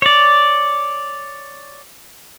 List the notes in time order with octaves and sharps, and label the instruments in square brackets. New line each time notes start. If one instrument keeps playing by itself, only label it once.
[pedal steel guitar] C#5 D5